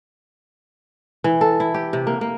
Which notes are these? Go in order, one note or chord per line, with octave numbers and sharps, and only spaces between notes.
E3
A4
E4
G4
C3
A#3
A#3